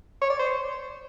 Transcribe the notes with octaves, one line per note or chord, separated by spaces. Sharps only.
C#5
D5
C5